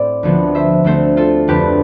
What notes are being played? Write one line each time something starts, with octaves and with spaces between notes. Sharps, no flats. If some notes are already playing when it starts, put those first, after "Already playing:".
Already playing: A2 C4 D5
D2 D3 F3 B3
C5 E5
D2 D3 A3 C4 A4 C5
F4 A4
F2 D3 A3 G4 B4